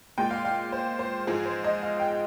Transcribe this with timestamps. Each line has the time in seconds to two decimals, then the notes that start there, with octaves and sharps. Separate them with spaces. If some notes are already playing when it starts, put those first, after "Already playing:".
0.18 A#2 G#3 G5
0.31 F5
0.45 F5
0.72 C5
0.99 C5
1.27 G#2 F3 G#3 G#4
1.46 C5
1.64 D#5
1.82 F5
2.00 G5